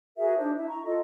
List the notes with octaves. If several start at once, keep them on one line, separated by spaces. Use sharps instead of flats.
F#4 G#4 A#4 E5
D4 D#4 C5
E4 E5
A#5 C#6
F4 A4 D#5